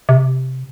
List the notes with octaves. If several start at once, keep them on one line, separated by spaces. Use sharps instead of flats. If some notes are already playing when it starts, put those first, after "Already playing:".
C3